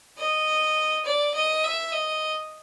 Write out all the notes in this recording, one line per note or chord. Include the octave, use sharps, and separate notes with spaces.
D#5
D5
D#5
E5
D#5